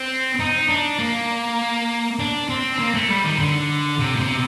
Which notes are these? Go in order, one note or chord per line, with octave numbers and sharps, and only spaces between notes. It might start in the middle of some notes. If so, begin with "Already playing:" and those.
Already playing: C4
D#4
D4
A#3
D4
C4
A#3
A3
G3
D#3
D3
C3
A#2
C3